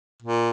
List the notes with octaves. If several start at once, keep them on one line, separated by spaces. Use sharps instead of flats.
A#2